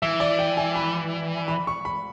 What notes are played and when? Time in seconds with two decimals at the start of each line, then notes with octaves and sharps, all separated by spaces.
0.02 E3 E5
0.20 D5
0.39 G5
0.57 G#5
0.76 B5
1.48 B5
1.67 C#6
1.85 B5